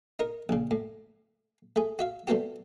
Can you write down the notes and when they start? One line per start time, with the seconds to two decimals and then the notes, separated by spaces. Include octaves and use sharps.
0.19 D#4 A#4
0.49 A#1 C#3
0.71 A2
1.76 A3 G#4
1.99 F#4 E5 F5
2.27 G3 A3 B3 C4 F#4 G4